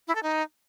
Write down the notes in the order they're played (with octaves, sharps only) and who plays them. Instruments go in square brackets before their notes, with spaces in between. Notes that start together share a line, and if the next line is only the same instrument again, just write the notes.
[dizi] E4
A4
D#4